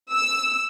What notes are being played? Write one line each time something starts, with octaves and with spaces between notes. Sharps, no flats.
E6